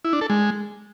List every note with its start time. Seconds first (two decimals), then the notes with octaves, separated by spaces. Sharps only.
0.05 E4
0.13 D4
0.21 A4
0.30 G#3